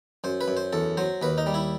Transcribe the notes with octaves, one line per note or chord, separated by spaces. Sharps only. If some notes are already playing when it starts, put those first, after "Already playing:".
F#2 C5
B4
F#2
C5
E2 A4
F#3 C5
D#2 B4
D#4
G3
E4